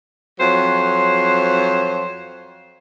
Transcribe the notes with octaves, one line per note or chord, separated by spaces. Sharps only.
F2 F#3 C5